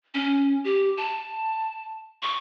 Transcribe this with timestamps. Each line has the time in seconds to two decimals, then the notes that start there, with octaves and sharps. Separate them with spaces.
0.14 C#4
0.64 G4
0.97 A5
2.22 C#6